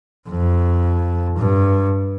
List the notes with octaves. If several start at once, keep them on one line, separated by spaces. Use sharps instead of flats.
F2
G2